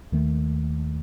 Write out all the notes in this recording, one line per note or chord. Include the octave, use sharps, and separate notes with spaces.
D#2 D#3 A3